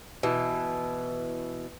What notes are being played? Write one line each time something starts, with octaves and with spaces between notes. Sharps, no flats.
B2 E3